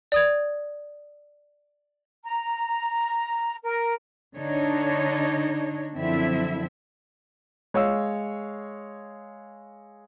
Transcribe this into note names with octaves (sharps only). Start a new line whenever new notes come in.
D5 D#6 G#6
A#5
A#4
D3 D4 D#4 C#5
F#2 D3 F3 C4 E4 E5
G#3 C#5 F5 E6